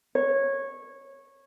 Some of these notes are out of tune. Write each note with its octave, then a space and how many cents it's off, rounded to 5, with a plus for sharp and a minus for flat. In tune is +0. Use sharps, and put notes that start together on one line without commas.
C#5 -15